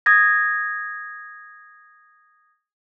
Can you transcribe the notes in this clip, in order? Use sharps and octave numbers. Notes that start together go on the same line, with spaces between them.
D#6 G#6 A#6